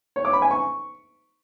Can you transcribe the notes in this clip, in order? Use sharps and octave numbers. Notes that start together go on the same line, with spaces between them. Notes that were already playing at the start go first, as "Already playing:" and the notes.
C#5
D6
B5
G#5
C#6